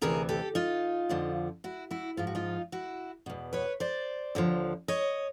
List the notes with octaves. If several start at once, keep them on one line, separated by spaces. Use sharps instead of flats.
D2 C3 E3 G#4 A#4
G4 A4
D#4 F4
F2 D3 F3
E4 F#4
E4 F#4
G#2 F3 F4
F#4
D#4 F4
E4 F#4
E2 B2
B4 C#5
C5 D5
D#2 D3 F3
C#5 D#5